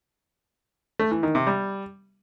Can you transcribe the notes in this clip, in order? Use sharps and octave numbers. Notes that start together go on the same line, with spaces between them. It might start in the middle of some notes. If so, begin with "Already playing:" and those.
A3
E3
D#3
C3
G3